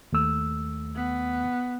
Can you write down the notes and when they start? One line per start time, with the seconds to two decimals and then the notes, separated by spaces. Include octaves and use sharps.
0.12 D#2 A3 E6
0.96 B3